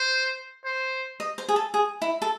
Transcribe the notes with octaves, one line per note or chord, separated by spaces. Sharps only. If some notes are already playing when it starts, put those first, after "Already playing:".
Already playing: C5
C5
D#5
C5
G#4
A4
G#4
E4
A4